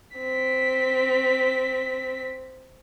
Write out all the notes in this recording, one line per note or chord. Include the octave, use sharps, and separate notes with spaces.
C4 B6